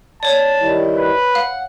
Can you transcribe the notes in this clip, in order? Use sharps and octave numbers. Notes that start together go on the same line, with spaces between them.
C#5 D5 A5
D#3 G3 E4
B4
F5 F#5